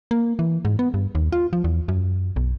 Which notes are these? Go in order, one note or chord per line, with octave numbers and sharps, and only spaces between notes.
A#3
E3
G#2
B3
G2
D#2
F4
F3
E2
F#2
B1